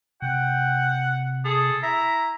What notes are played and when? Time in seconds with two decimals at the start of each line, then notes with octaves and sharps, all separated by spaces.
0.22 C3 F#5 G5
1.45 G#4 A4
1.83 E4 E5 A#5